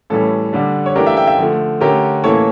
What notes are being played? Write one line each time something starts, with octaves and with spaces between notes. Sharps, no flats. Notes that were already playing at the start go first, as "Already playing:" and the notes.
A2 E3 G3 C#4 A4
D3 G3 D4
C#5
E3 A3 D4 G4 A#4
E5 G5
E5 G5
E5 G5
D3 F3 A3
D3 A3 C#4 G4 A#4
A2 E3 A#3 C#4 A4 C#5